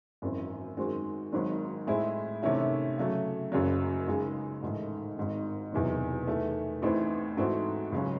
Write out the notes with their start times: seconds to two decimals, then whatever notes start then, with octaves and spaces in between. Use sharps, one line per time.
0.22 G#1 F#2 E3 C4
0.77 F#2 D#3 G#3 C4 F#4
1.32 G#1 G#2 D#3 F#3 C4
1.87 A2 G#3 C4 E4 G#4
2.42 C3 D#3 A3 C#4 E4
2.98 C#3 F#3 A3
3.52 F#1 F#2 C#3 F#3
4.07 C#2 C#3 G#3 D#4 G#4
4.62 A1 G#2 D#3 A3
5.17 G#1 G#2 D#3
5.72 E1 E2 C3 D#3 F#3
6.27 E2 D#3 A3
6.82 A1 A2 E3 C4 D#4
7.37 G#2 E3 A3 C4 F#4
7.92 C#2 C#3 F#3 C#4